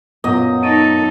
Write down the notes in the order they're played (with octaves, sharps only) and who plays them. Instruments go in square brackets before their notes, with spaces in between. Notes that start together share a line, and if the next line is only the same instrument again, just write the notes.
[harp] F#2 A#2 [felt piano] B3 [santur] D#5
[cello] D#4 A4 [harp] C#6 D7 D#7